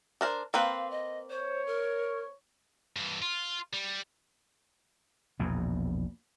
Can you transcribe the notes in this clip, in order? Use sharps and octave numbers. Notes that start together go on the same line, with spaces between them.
D4 A#4 C5
A#3 C4 B4 F5
D#5
C5 C#5
A#4
G2 E3
F4
G3
A#1 E2 B2